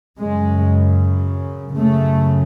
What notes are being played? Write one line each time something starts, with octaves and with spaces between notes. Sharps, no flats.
F#2 C#3 G#3
F#2 C#3 A3